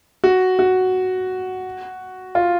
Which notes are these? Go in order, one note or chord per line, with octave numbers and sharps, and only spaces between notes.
F#4
F#4
F4